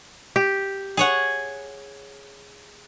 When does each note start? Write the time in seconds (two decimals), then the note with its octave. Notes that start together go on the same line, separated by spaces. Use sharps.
0.36 G4
0.97 G#4 C#5 F#5